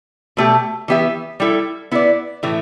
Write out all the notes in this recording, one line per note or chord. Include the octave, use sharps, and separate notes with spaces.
B2 A3 G4
E3 B3 G4 E5
G3 E4 A4
B3 E4 B4 D5
A2 E3 A3